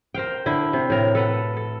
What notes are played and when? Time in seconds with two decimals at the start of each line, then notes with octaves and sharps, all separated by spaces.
0.14 A#4 C5 F5 G5
0.46 D3 E4
0.73 C3
0.90 A2 A#4
1.15 A4 B4 F#5
1.57 A4